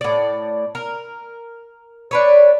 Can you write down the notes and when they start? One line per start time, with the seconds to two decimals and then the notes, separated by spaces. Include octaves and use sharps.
0.01 A2 D5
0.75 A#4
2.11 D4 B4 C#5